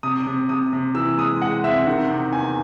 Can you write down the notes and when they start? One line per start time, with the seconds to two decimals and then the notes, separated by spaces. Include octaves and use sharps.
0.03 C3 D#6
0.26 C3
0.49 C3 D#6
0.73 C3
0.95 E3 E6
1.17 G#3 D#6
1.41 G#3 F#5
1.64 C4 E5
1.87 D#3 F#5
2.10 C3
2.33 E2 G#5